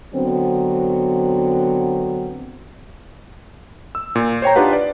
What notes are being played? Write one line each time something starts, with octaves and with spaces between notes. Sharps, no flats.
D3 F#3 B3 C4
E6
A#2
C5 C#5 G5 A#5
D4 D#4 F4 G4 B4 F#5
D5